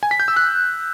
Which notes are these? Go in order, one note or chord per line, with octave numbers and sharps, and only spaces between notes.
G#5
B6
G6
E6
F#6